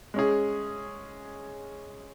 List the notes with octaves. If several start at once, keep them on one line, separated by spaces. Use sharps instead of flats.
G#3 C#4 G#4